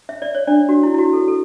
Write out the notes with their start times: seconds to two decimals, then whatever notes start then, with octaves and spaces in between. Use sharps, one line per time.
0.09 E5
0.22 D5
0.35 C#5
0.47 D4 D5
0.69 F#4
0.83 E4
0.94 E4
0.98 F#4
1.13 A4
1.28 A4